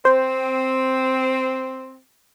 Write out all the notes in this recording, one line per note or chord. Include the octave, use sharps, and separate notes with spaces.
C4 C5